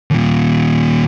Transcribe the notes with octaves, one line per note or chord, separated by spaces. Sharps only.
D#2 A#2